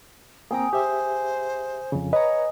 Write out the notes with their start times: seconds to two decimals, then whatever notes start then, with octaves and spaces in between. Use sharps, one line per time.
0.51 A#3 C4 G#4 G5 A#5
0.73 G4 C5 E5
1.92 F2 C#3
2.13 B4 C#5 D#5 A#5